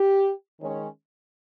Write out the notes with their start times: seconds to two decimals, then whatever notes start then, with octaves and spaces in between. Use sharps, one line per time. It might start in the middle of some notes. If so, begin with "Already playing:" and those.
Already playing: G4
0.60 D#3 G#3 C#4